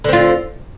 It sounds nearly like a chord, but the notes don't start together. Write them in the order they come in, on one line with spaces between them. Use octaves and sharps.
D3 C4 F4